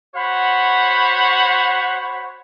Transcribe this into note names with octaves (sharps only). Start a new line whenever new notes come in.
F#4 C5 C#5 F#5 B5